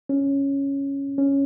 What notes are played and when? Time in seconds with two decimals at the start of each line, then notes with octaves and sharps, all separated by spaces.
0.09 C#4
1.18 C#4